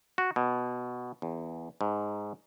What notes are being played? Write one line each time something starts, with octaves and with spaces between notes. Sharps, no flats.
F#4
B2
E2
G#2